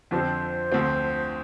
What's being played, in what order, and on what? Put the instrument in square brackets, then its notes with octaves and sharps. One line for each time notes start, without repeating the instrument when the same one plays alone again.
[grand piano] F2 D3 F3 C4 [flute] C5
[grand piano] D2 D3 F3 C4